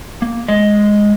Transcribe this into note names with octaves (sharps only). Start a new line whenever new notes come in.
A#3
G#3 D#5